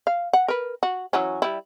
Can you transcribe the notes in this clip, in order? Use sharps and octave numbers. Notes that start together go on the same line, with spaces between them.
F5
F#5
A#4 B4
F#4
E3 F#3 C#4
G3 E4